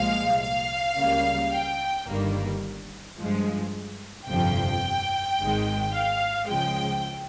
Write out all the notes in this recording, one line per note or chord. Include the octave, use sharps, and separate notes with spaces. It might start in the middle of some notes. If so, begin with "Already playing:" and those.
Already playing: C2 A#2 F3 G#3 F5
F5
C#2 C#3 G3 A#3
G5
G1 G2 D#3 G3 A#3
G2 F3 G#3
G1 F2 C3 F3 G5
G#1 G#2 D#3 G#3
F5
C#2 C#3 F3 G#3 G5